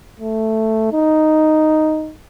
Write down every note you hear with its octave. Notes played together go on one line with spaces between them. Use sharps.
A3
D#4